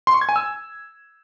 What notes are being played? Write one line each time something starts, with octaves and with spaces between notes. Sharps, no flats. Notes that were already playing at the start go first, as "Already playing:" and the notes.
C6
C#6
G#6
G#5
E6